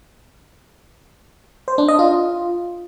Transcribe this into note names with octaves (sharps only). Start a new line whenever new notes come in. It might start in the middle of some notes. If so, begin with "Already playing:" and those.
C5
D4
D#5
F4